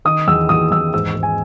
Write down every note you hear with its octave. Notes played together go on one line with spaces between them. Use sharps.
D#3 D#6
E2 E6
E2 D#6
E2 E6
G#2 E6
G#2
G#5